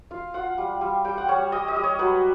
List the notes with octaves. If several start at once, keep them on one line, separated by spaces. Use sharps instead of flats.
F4 F5
F4 F#5
G3
G3
G3 G5
F#5
G3 C#5
G3 D#5
D#5
G3
C#5
F#3 B4